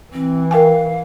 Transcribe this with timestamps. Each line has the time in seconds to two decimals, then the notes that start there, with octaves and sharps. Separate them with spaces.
0.13 E3 C4
0.51 A#4 F5 G5 G#5